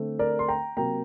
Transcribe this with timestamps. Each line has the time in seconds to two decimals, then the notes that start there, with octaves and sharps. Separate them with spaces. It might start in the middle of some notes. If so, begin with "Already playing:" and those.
Already playing: D3 A3 C4
0.19 A#4 D5
0.39 C6
0.48 G5 A#5
0.77 C3 F#3 A#3 G5 A#5